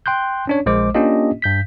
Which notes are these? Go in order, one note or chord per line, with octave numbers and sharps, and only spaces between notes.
G5 C6 F#6 G6
C#4 D4 C#5
A#1 G#3 C5 D6
A#3 C#4 D4 F4 G4 D#5
G2 G6 B6